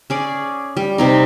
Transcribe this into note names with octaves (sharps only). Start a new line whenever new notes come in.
C#4 G#4 D5
G3
C3 C4 D#4